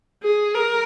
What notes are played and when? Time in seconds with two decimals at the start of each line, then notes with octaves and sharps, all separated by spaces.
0.23 G#4
0.55 A#4